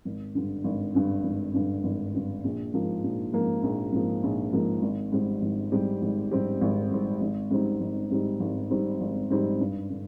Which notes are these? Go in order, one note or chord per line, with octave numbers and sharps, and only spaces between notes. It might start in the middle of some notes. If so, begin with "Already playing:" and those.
G#1
G2 D3
G#1
G2 D3
G#1
G2 D3
G#1
G2 D3
A#1
G#2 F3 A#3
A#1
G#2 F3 A#3
A#1
G#2 F3 A#3
A#1
G#2 F3 A#3
G#1
G#2 G3 C4 G4
G#1
G#2 G3 C4 G4
G#1
G#2 G3 C4 G4
G#1
G#2 G3 C4 G4
G#1
G#2 G3 C4 D#4
G#1
G#2 G3 C4 D#4
G#1
G#2 G3 C4 D#4
G#1
G#2 G3 C4 D#4
G2
D3